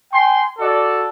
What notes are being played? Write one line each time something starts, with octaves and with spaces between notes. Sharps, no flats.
G5 G#5 C6
F#4 A4 D5